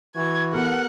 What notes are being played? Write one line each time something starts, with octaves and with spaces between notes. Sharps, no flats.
E3 F#4 G#6
B3 G4 A4 A#4 F#5